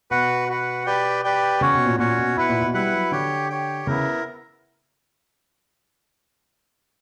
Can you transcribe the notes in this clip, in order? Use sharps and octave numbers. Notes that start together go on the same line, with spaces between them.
B2 F#4 B4 F#5
F#4 B4 F#5
G4 B4 D5 G5
G4 B4 D5 G5
C#3 C#4 F#4 C#5
B2
A#2
A#2 C#4 F#4 C#5
B2
B2 E4 B4 F#5
A#2
B2
G3 E4 B4 F#5
F#3
D3 G4 C#5 G5
G4 C#5 G5
C#3 B3 E4 A#4